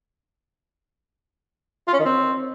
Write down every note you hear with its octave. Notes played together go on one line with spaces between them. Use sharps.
F4
C#4
D#3
C4